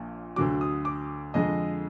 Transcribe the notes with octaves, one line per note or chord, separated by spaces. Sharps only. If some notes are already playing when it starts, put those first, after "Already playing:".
Already playing: A#1 A#2
D2 D3 F#3 D6
D#6
D6
F2 D3 G#3 D#5